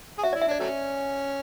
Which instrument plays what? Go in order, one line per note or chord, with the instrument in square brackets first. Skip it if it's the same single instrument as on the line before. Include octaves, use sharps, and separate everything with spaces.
[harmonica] G#4
[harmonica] F#4 [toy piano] E5
[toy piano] D5
[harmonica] E4
[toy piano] E5
[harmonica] D4 [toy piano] D5
[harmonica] F#3 A3 C#4